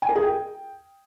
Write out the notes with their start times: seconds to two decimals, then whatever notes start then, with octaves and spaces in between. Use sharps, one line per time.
0.02 G#5
0.09 A#4
0.16 G#4
0.22 G5